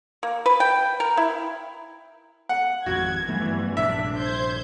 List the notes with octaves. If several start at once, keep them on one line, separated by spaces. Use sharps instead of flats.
A#3
B4
G5
A#4
E4
F#5
G#1 F2 G#2 F#4 G#6
G2 E3 F#3 A3 B3
A#1 G2 C3 D4 E5
C5 G6 G#6